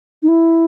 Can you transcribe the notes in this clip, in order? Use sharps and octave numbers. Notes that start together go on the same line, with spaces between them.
D#4
E4